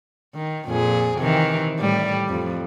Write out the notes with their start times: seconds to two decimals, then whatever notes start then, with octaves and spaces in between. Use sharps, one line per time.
0.35 D#3
0.66 F2 A#2 G#4
1.18 C3 D#3 E3
1.79 A2 G3
2.29 F2